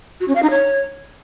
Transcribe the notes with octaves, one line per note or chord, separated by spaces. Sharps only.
F#4
C#4
F5
D#4
C#5